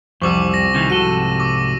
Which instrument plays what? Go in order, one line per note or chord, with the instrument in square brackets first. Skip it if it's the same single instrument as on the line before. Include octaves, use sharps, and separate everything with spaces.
[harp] C2 C3 F3 [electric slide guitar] F2 G3 [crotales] C#6 D6 E6
[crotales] E6 A#6
[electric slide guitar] C3 D#3 E3 [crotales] D6
[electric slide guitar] G#2 C3 A4 [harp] F#4 [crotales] D#7
[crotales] C#6 D6 E6